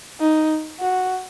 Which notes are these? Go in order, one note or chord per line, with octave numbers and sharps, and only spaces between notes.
D#4
F#4